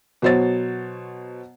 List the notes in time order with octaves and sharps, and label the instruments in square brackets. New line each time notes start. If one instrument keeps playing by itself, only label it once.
[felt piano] B2 F#3 C5 C#5 A6